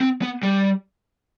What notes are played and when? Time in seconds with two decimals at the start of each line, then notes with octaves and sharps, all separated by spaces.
0.01 C4
0.22 B3
0.43 G3